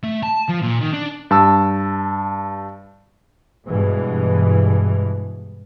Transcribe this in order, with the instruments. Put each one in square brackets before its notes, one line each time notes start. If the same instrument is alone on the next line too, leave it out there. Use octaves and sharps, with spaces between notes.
[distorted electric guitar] A3
A5
F3
A#2
D#3
D4
[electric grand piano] G2 A5 E6
[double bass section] G2 B2 E3 G#3